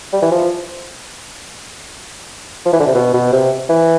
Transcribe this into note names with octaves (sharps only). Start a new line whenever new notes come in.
G3
E3
F3
F3
E3
D3
C3
B2
B2
C3
E3